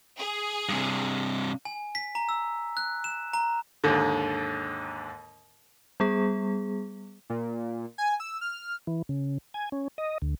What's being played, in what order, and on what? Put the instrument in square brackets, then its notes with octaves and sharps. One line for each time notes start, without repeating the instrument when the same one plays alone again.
[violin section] G#4
[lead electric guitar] G2 C3
[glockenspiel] G#5
B6
A#5
E6
F#6
E7
A#5
[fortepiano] D#2 G#2 D3
[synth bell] G3 B3 G#4
[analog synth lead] A#2
G#5
E6
F6
[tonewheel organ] E3
C#3
G#5
C#4
D#5
D2